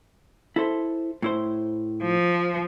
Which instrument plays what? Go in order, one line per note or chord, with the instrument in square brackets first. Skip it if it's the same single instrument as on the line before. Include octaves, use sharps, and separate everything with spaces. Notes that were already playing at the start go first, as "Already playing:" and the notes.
[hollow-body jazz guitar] E4 A4 C5
A2 E4 C5
[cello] F3